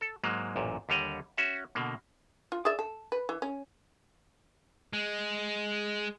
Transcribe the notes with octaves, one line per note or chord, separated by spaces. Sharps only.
A4
G#2 F#3 G#3 A#3
A1 F#2 A#2
D#2 D3 G3 C#5 D#5 F#5
C#4 F#4 E5
B2 D3 A#3
F4
G#4 D5 E5
A4
B4
E3
C#4
G#3